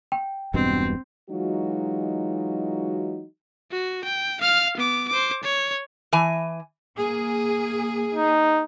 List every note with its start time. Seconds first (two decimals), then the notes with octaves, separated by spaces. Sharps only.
0.12 G5
0.54 E1 G2 B2 C4
1.30 E3 F#3 G#3 D#4 F4 F#4
3.72 F#4
4.04 G5
4.41 F5 F6
4.77 B3 D6
5.08 C5 D6
5.43 C#5
6.13 E3 G#5
6.98 A#3 G#4
8.15 D#4